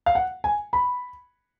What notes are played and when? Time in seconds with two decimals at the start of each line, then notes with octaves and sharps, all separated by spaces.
0.06 F5
0.15 F#5
0.44 G#5
0.73 B5